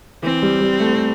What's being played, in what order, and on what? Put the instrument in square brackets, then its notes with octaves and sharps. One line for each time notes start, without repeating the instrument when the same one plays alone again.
[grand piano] E3 [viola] C4
[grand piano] G3
G3
A3